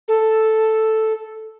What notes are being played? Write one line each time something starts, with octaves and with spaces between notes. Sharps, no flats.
A4